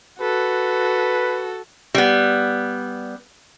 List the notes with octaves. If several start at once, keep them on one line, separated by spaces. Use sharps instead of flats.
F#4 A4 B4
G3 B3